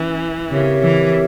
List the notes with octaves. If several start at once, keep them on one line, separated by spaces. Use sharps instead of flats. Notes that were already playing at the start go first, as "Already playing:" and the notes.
Already playing: E3 C#4
C#3 C4 G4 A#4 C#5 E5
E3